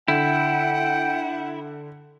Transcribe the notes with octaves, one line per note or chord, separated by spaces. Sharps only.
D3 E4 F#5 G5